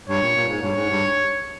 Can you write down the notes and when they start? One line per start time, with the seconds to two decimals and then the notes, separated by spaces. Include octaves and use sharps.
0.08 G2 C#5
0.22 A#2
0.35 A#2
0.48 G#2
0.62 G2 C#5
0.75 G#2
0.89 G2